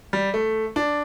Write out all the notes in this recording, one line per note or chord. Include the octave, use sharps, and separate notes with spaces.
G3
A3
D4